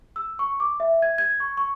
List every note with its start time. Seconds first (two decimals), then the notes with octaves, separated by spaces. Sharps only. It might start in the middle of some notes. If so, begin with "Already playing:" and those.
0.16 E6
0.39 C#6
0.60 D6
0.80 E5
1.02 G#6
1.18 G#6
1.40 C#6
1.57 C#6